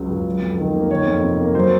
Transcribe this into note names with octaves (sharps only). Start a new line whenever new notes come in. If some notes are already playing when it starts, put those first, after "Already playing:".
Already playing: C#2 C#3 F#3
C#2
F#3
F2
D#3
A#3
D#3 C#5
F2
C3
A#3
F#3 C5